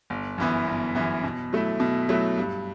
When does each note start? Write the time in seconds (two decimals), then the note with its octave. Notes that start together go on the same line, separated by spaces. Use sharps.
0.10 G1
0.38 F#2 E3 B3 E4
0.67 G1
0.95 F#2 E3 B3 E4
1.24 B2
1.53 F#3 A3 E4
1.80 B2
2.09 F#3 A3 E4
2.37 G2